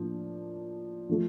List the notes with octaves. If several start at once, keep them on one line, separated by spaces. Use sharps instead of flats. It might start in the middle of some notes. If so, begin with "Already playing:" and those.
Already playing: A2 F3 A#3 D4
F3 A3